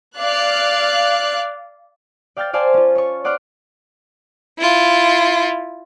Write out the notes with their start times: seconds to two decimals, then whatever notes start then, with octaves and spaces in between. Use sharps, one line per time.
0.18 D5 F5 F#6
2.37 D5 F5 G5 F6 G6 A6
2.53 C5 D5 F5 G#5 A5 C6
2.74 C#4 F4
2.95 C#5 C#6
3.24 C#5 D5 F#5 C6 D6 F6
4.59 E4 F4